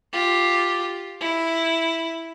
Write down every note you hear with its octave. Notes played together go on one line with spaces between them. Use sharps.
F4 G4
E4